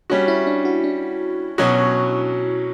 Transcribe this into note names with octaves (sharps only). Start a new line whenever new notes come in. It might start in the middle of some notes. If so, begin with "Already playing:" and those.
G3 C#4 D4 F#4
E4
D4
F#4
D4
B2 F#3 C#4 F#4